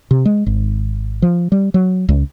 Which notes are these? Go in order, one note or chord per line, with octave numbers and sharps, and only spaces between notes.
C3
G#3
G#1
F3
G3
F#3
C#2